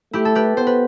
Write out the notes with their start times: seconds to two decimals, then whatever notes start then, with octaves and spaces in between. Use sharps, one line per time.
0.13 A3 E4 G4
0.25 A4
0.35 G4 B4
0.57 B3 C5
0.67 B4